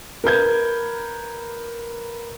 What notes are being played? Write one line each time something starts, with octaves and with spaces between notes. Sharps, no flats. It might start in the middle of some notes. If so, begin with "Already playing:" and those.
A#4 B4 G6 G#6